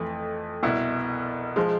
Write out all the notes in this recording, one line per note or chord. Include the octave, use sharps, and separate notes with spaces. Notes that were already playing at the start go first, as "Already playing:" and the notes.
Already playing: F2 E3 A3
C2 B2 B3 E4
F3 G#3